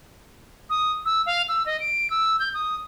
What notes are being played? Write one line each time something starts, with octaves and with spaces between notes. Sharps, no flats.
D#6
E6
F5
E6
D#5
D7
E6
G6
D#6